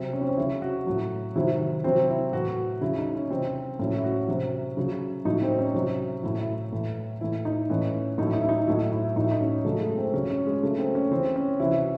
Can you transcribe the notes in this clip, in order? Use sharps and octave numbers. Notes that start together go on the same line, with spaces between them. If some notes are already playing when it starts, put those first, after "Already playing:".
Already playing: C3 F#3 C4
C#4
C4
C#4
C#3 F#3 E4
F#4
A2 F#3
C3 D#3 F#3 E4
C3 F#3 C4
E4
A2 E3 F#4
C#3 F#3 E4
D#4
C#4
C3 E3 C4
A2 F#3 C#4
E4
F#4
C3 F#3
C#3 F#3
A2 F#3 D#4
C4
C#4
C3 F#3
A2 F#3 E4
E4
A2 E3
A2 E3 E4
D#4
A2 E3 C#4
A2 F#3 D#4 E4
D#4
E4
D#4
A2 F#3 E4
E4
A2 F#3 D#4
E4
D#4
C#4
C#3 F#3 A3
G#3
C4
C#3 F#3 C#4
C#4
G#3
C#3 F#3 A3
C4
C#4
C#3 E3 C4
C#4
C3 E3 E4
E4
F#4